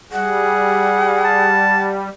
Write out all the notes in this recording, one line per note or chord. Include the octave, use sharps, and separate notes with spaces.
G3 G#4 F#5
A5